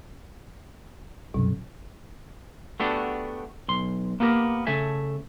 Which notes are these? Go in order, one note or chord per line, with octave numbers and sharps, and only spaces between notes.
C2 F#2 B2
A3 B3 D4 F#4 G4
B1 C6
A#3 B3 G4 G#4 A#4
C#3 A3 A4 E5 G#5